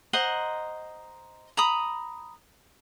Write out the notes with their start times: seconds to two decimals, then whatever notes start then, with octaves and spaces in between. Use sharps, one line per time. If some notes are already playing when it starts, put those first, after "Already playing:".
0.13 C5 D#5 F#5 A#5
1.57 A#5 B5 D#6